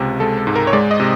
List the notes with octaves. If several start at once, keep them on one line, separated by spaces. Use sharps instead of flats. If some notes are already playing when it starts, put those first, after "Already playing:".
Already playing: C#2 C3
G#3 A4
A4
G#2
A#4
C#5
G#3 D5
D#5
C3